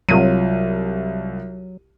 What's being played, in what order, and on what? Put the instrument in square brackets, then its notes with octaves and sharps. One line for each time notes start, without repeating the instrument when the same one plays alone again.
[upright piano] C2 F4 D#7 [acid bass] F#3